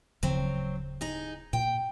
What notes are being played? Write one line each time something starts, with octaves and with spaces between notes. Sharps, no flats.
D1 C#3 F3 F#3 C4
D#4 G#4
A#2 G5